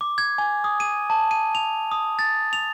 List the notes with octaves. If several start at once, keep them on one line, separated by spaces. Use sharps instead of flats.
D6
G#6
G#5
D#6
D#7
A5
D#7
F7
D#6
A6
F7